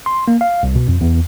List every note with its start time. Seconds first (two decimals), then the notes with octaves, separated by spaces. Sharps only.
0.06 C6
0.28 A#3
0.41 F5
0.63 C2
0.76 B2
0.88 F2
1.01 E2